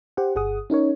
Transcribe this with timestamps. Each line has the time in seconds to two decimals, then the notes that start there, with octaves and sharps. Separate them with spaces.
0.17 G4 C5 F#5
0.35 G1 G#4 F#5 D#6
0.70 C#4 D#4 A#4 C#5